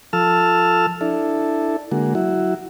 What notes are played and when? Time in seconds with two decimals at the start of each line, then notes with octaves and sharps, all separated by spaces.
0.13 F3 A4 A5 E6 F6
1.01 D4 E4 A4
1.92 D3 G#3 A#3 F#4
2.15 F#3 E4 F#4